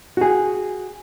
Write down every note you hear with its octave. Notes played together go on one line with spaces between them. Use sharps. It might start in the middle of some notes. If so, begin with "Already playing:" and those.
F#4 G#4